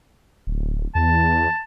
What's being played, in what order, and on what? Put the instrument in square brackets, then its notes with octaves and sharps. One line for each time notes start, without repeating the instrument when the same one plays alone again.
[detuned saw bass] D1
[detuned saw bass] E2 [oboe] A5